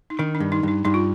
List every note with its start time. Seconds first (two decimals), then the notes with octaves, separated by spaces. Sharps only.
0.10 D#4
0.19 D#3 D4
0.35 D4
0.40 G2
0.52 D#4
0.63 G2 D#4
0.85 G2 D#4
0.94 F4